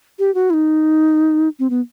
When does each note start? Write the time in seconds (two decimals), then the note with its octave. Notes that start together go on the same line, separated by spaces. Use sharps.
0.19 G4
0.35 F#4
0.50 E4
0.53 D#4
1.59 C4
1.70 B3